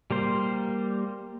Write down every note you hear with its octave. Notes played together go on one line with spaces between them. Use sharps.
G3 A#3 C5